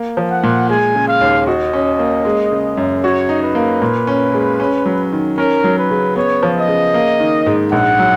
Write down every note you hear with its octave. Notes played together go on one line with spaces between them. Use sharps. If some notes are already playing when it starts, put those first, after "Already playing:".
Already playing: A#3
F3
F#5
A#2
G#3 G#5
C#3
F5
D#2
F#4 D#5
C#4
A#3
G#3
C#3
F#2
F#4 C#5
D#4
B4
A#3
A#2
C#4
G#3
C#4
F#3
D#3
C#4 A#4
F#3
B4
C#3
B3 C#5
F3
D#5
C#3
A#3
D#3
G#2
A#1 F#5
F#3